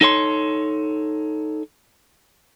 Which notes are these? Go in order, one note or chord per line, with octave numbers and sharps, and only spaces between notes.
D#4 A4 C#5 C6